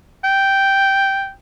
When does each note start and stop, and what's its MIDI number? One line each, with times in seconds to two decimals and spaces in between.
0.24 1.31 79